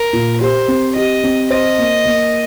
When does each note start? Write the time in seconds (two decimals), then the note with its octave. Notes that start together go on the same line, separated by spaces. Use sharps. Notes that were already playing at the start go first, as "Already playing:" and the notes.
Already playing: A#4
0.13 A#2
0.40 G4 C5
0.68 C4
0.95 G4 D#5
1.24 C4
1.50 C5 D#5
1.78 A#3
2.06 A#3